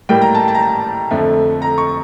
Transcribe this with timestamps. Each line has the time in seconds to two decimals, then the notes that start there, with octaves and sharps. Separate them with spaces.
0.09 A2 G3 A#3 G5
0.22 A#5
0.35 A5
0.48 A5
0.55 A#5
0.62 A5
1.11 F2 D3 A3
1.62 A#5
1.78 C#6